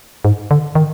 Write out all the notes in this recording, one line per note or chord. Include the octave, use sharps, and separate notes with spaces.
G#2
D3
D#3